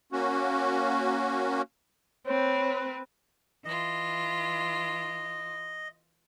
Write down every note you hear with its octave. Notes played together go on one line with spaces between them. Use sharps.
A#3 C#4 F#4
C4 B4 C#5
E3 F4 D#5